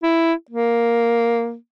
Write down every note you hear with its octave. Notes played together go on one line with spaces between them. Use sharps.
E4
A#3